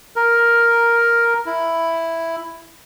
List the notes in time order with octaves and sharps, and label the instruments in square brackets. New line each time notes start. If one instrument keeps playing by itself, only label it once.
[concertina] A#4
E4